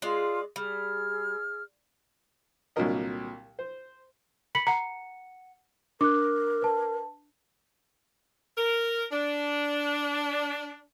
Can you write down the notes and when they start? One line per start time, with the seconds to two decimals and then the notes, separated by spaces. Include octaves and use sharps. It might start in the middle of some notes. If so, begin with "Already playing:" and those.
0.02 G#3 F4 D5
0.56 G3 G#4 F6
2.76 C2 A#2 D3 F#3 A#4 D#5
3.59 C5
4.55 B5 B6 C#7 F#7
4.67 F#5 A#5 C#7
6.01 D4 A#4 D6 F#6
6.62 B4 A5
8.58 A#4
9.12 D4